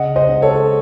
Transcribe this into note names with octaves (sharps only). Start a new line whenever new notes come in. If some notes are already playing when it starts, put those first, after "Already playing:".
Already playing: C#3 D#5 F#5
C5 D#5
C#2
A4 C#5